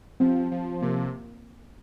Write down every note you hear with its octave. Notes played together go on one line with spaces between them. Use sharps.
F3 C4
F3
C3 A#3